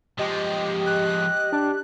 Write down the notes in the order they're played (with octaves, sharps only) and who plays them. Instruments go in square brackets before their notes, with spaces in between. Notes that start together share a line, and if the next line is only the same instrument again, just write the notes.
[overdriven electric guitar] F3 G#3 [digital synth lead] G4 [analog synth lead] D#5
[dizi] F#6
[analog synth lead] D4